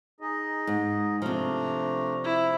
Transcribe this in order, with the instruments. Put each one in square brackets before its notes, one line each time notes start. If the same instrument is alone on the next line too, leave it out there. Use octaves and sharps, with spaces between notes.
[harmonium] D#4 G#4 D#5
[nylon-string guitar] G#2
[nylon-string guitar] C3 F3 [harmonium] A3 D4 A#5
[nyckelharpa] E4